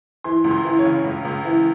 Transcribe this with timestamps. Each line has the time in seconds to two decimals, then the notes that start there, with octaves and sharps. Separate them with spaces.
0.24 E3 C6
0.44 C#2
0.51 C6
0.65 E3
0.79 C#5
0.85 C#3
1.04 C#2
1.25 C#2
1.45 E3